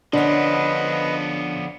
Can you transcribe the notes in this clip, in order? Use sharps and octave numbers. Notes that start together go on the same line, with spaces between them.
D3 F3 B3 C#4 D4 B4 D#5